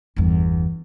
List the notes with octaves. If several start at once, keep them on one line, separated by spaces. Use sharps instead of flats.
G1 E2